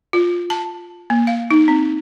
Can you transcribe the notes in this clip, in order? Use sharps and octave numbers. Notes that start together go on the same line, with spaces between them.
F4
A5
A#3
F5
D#4
C4